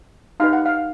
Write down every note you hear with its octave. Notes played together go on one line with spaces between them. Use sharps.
D#4 G4 B4 F5
F#5
F5